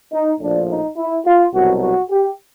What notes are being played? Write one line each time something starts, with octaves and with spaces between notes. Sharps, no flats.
D#4
A#1 A2 F3 D4
D#4
E4
F4
C2 B2 F#3 F#4
F#4
G4